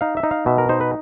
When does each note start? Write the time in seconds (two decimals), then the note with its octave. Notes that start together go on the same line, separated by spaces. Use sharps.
0.01 D#4 F5
0.17 E5
0.23 D#4
0.31 F5
0.46 B2 E5
0.58 A#4
0.69 D#4 C5
0.81 B4